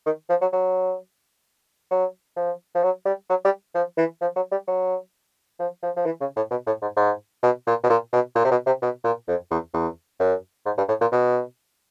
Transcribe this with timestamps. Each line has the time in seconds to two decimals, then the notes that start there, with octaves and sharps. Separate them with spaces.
0.06 D#3
0.29 F3
0.41 F#3
0.52 F#3
1.91 F#3
2.36 F3
2.75 F3
2.83 F#3
3.05 G3
3.29 F#3
3.45 G3
3.75 F3
3.98 E3
4.21 F3
4.36 F#3
4.52 G3
4.68 F#3
5.60 F3
5.83 F3
5.97 F3
6.06 E3
6.21 C#3
6.36 A2
6.51 B2
6.66 A2
6.82 G#2
6.97 G#2
7.43 B2
7.67 A#2
7.84 B2
7.89 A#2
8.13 B2
8.35 A#2
8.45 C3
8.51 B2
8.66 C3
8.82 B2
9.04 A#2
9.28 F2
9.51 E2
9.74 E2
10.20 F#2
10.66 G#2
10.77 G2
10.89 A2
11.01 A#2
11.12 B2